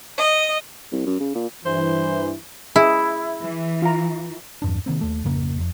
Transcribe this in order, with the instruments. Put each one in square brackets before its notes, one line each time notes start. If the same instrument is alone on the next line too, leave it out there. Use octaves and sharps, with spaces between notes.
[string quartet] D#5
[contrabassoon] C2
F#2
C#3
A#2
[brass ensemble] G2 E3 [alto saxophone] C5
[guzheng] E4 [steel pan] G#4
[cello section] E3
[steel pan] F4 A#5
[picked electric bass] E2 G2 D4
C3 D#3 A#3 C4
D#2 A3
G#1 F2 C#3 A#3
F1 F2